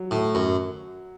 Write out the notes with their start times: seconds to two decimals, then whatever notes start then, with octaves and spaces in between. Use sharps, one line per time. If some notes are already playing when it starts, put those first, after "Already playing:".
Already playing: F#3
0.11 A2
0.35 F#2